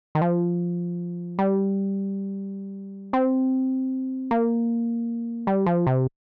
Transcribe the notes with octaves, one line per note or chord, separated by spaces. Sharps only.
D#3
F3
G3
C4
A#3
G3
F3
C3